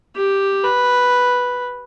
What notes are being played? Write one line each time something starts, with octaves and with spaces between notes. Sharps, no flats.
G4
B4